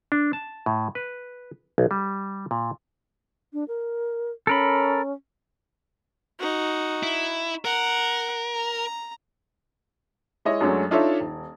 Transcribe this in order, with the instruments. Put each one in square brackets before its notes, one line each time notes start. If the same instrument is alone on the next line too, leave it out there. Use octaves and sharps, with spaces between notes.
[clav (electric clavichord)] D4
A5
A2
B4
B1
G3
A#2
[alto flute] D4
A#4
[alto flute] C#4 [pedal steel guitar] A4 A#4 B5
[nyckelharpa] D#4 F#4
[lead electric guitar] E4
[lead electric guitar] A#4 [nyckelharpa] F#5
[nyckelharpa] A#5
[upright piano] G#3 E4 C#5 D#5
F#2 F#3 G#3 A3 C#4 D4
D4 D#4 F4 A4 C#5 E5
D#1